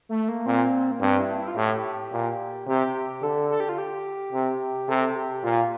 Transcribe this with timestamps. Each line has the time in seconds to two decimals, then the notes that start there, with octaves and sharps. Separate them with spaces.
0.09 A3
0.28 A#3
0.46 A#2 C4
0.91 A#3
1.01 G2 C4
1.20 E4
1.37 E4
1.47 F4
1.56 A2 G4
2.12 A#2
2.67 C3 G4
3.22 D3 A4
3.50 A4
3.60 G4
3.69 F4
3.78 G4
4.32 C3
4.89 C3 A4
5.16 G4
5.44 A#2 F4